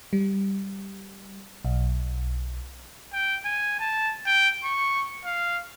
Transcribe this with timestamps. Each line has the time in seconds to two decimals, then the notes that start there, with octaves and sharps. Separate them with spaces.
0.13 G3
1.65 B1
3.13 G5
3.45 G#5
3.80 A5
4.26 G5
4.63 C#6
5.25 F5